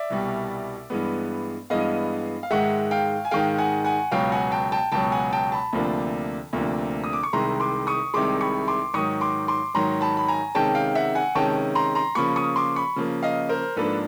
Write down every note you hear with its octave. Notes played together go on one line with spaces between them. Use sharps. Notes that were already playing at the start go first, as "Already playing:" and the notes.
Already playing: D5 E5
C2 B2 G3
G2 E3 G#3 B3
G2 E3 G#3 B3 D#5 F5
F5
G#2 D#3 G#3 E5 F#5
F5 G5
G#5
G#2 D#3 G#3 F5 G5
F#5 G#5
F#5 G#5
C#2 B2 F#3 F5 G5
F#5 G#5
G5 A5
G5 A5
C#2 B2 F#3 G5 A5
F#5 G#5
G5 A5
A5 B5
D2 C3 F3 A#3 D4
D2 C3 F3 A#3 D4
D#6
D6
C#6
C2 C3 D#3 G#3 A#5 C6
C6 D6
C#6 D#6
C2 C3 D#3 G#3 C6 D6
B5 C#6
C6 D6
G#2 D#3 F#3 C#6 D#6
C6 D6
C6 D6
G#2 D#3 F#3 A#5 C6
A5 B5
B5
G#5 A#5
C3 D#3 G#3 C#4 G5 A5
F5 G5
E5 F#5
F#5 G#5
C3 D#3 G#3 C#4 G5 A5
A#5 C6
A#5 C6
C#3 F3 A#3 B5 C#6
C#6 D#6
C6 D6
B5 C#6
C#3 F3 A#3
D#5 F5
A#4 C5
G#2 F3 A#3 D4 A4 B4